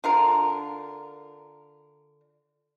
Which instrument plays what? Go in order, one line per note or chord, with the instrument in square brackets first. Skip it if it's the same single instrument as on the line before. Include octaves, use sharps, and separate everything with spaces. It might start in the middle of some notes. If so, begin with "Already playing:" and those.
[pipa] D3 F4 A#4